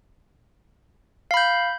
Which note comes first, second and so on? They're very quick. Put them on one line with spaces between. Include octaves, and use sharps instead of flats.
F5 B5 G6